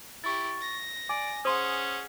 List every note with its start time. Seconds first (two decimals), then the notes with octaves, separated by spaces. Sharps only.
0.24 E4 G4 C#6 A6
0.61 A#6
1.09 D5 G#5 D6
1.45 C#4 G#4 C5 F#5 C6 D#6